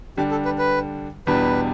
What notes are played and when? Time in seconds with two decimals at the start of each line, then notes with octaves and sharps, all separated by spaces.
0.17 D3 G3 D4 G4
0.31 A4
0.45 B4
0.58 B4
1.27 E2 B2 G3 D4 B4